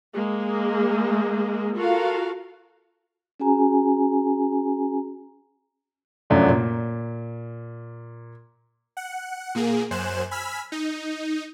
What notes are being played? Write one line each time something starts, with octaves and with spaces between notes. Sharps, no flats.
G#3 A#3
F4 F#4 A4 A#4 F5
C#4 F#4 G#4 G#5 A#5
F1 F#2 F#3 A3 D4 F4
A#2
F#5
A#2 A#3 G#4
F#2 C5 G#5 F#6 E7
G#5 B5 E6 F6 B6
D#4